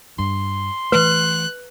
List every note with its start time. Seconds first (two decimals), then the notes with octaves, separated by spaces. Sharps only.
0.19 G2 C6
0.92 E3 A3 B4 F#6